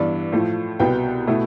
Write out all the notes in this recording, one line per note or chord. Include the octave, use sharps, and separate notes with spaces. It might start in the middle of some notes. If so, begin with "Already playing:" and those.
Already playing: G2 E3 B3 D4 D5
A2 F3 A3
C2 B2 B3 G5
B2 A3 E4